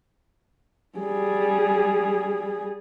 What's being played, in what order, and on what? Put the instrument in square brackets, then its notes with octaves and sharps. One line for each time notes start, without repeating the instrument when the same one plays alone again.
[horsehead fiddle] G3 G#4